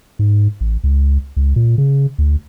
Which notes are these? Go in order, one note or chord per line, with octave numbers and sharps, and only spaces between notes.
G#2
A1
C#2
C#2
A#2
C#3
D2